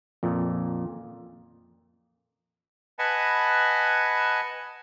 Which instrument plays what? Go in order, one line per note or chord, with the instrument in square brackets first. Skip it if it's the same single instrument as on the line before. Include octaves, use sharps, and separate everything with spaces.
[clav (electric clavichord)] F2 A#2
[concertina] B4 D#5 F#5 G#5 A5 B5